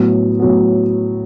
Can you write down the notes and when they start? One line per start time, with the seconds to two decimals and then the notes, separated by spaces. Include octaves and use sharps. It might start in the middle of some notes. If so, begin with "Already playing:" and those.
Already playing: A2 F#3 B3
0.39 A2 F#3 B3